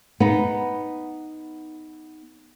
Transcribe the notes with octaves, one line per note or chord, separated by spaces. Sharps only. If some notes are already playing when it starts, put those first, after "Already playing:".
B3 D#4